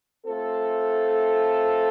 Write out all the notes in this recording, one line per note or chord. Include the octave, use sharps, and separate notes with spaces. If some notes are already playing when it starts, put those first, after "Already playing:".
A3 C4 F4 A4